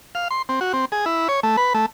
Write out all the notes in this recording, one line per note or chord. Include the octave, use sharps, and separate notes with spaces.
F5
C6
C4
F#4
C4
G#4
E4
C#5
A3
B4
A3